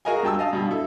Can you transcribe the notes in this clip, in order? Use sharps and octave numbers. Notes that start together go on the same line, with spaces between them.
F#4 G#4 A#4 D#5 F5 G#5
G2 G5 A5 E6
D#5 F5 A5
G2 B2
E4 A4